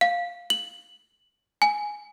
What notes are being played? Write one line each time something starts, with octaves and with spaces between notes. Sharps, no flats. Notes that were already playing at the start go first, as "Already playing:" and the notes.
F5
F#7
G#5